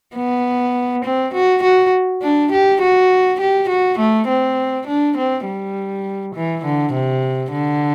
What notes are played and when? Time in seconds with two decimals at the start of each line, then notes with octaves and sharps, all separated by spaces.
0.16 B3
1.05 C4
1.34 F#4
1.63 F#4
2.22 D4
2.52 G4
2.82 F#4
3.40 G4
3.69 F#4
3.99 A3
4.28 C4
4.87 D4
5.17 C4
5.46 G3
6.35 E3
6.64 D3
6.94 C3
7.52 D3